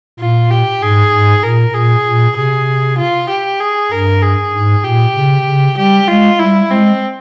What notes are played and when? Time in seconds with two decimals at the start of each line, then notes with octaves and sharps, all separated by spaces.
0.20 A#2 F4
0.51 G4
0.81 G#2 G#4
1.12 G#2
1.43 A#2 A#4
1.74 A#2 G#4
2.06 A#2
2.36 C3 G#4
2.98 F4
3.29 G4
3.60 G#4
3.91 G2 A#4
4.22 G#4
4.53 G#2
4.85 A#2 G4
5.15 C#3
5.46 C#3
5.77 G3 G4
6.08 G#3 F4
6.39 G3 E4
6.70 G#3 C4